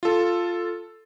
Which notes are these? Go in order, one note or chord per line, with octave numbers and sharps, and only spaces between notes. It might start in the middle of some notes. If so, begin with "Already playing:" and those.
F4 A4